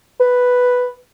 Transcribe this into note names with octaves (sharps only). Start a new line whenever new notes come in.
B4